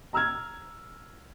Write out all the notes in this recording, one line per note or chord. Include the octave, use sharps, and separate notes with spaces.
A#5 E6 F6 G#6